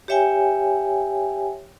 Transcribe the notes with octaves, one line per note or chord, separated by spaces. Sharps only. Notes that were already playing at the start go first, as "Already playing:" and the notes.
G4 C#5 E5 G5 G#5